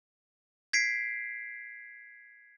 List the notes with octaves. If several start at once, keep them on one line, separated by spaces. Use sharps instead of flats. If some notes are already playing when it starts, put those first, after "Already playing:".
G#6 B6 C7 D7